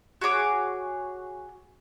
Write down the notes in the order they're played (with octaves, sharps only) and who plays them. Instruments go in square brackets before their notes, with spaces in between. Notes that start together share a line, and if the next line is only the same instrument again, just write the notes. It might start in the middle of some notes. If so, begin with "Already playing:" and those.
[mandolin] F#4 G#4 C#5 D6